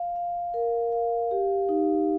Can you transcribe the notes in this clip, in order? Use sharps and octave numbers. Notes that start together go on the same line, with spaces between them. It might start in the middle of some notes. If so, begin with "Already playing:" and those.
Already playing: F5
F5
A#4
F5
G4
D#4